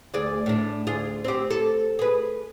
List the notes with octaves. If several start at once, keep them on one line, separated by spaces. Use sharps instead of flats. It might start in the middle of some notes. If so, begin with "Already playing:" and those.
D2 G#4 D5
A2 D4
D2 F4 G#4
C4 G4
A4
G#4 B4